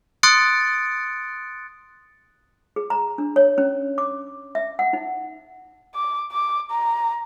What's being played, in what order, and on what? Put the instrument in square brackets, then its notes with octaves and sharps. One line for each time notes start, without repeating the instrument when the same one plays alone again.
[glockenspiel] C6 D#6 F#6 A6 C#7 D7
[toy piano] G#4
A#5
D4
C#5
C#4
D6
E5
F#5
D#4
[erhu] D6
D6
A#5